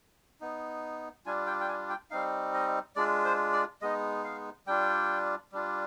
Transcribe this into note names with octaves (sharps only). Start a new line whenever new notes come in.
B3 D#4
G3 D4 F4 G#5
G5
G5
G#5
G5
G3 C4 D#4 F5
D#5
G#3 D4 F4 D5
C5
D5
G#3 B3 D#4 D#5
F5
G3 D4 F4 G5
G3 D4 F4